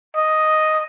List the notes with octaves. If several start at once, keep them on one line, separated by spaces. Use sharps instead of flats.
D#5